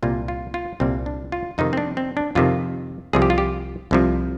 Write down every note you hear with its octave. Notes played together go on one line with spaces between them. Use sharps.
C2 A#2 G3 A#3 F4
F4
F4
C2 A#2 G3 A#3 C4
D4
F4
F2 C3 D#3 D#4
C4
D4
C4
D4
F2 C3 D#3 F4
C2 C3 F3 G#4
G4
F4
G4
C2 C3 F3